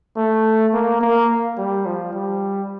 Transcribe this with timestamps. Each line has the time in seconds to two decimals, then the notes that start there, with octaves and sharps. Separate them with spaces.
0.17 A3
0.73 A#3
1.01 A#3
1.58 G3
1.86 F3
2.14 G3